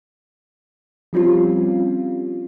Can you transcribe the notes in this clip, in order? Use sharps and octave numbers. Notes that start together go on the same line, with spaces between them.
F3 G3 C4 C#4 F4